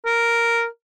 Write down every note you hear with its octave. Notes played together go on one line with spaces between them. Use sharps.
A#4